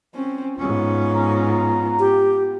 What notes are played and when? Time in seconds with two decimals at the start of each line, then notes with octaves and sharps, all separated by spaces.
0.15 C4 C#4
0.59 G#2 B3 C#4 F4
1.15 A#5
1.99 G4